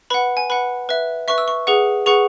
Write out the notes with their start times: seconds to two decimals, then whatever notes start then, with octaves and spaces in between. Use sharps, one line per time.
0.10 B4 F#5 B5
0.37 G#5
0.50 B4 F#5 B5
0.89 B4 E5
1.28 B4 E5 C#6
1.38 E6
1.48 C#6
1.67 G#4 B4 F#5
2.06 G#4 B4 F#5 C#6